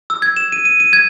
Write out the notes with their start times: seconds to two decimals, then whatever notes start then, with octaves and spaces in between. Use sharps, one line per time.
0.10 E6
0.22 G#6
0.37 E7
0.52 D#7
0.65 D#7
0.80 D#7
0.93 G#6